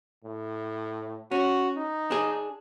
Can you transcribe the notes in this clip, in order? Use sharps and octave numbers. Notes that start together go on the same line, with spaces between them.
A2
C#4 F#4
D#4
D4 G#4